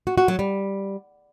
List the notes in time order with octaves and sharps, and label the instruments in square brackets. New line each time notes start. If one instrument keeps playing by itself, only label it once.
[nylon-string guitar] F#4
F#4
F#3
G3